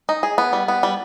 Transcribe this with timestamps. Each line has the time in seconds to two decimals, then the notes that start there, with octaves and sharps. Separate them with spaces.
0.09 D#4
0.23 G#4
0.38 B3
0.53 G3
0.68 B3
0.83 G3